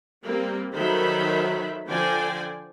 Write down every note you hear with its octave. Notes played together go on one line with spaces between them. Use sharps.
G3 A#3 C4
D#3 F#3 A4 C5 E5 B5
D3 F3 C5 D5 G5 G#5